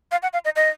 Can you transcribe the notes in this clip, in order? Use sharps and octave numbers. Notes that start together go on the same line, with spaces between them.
F5
F#5
F5
D#5
D#5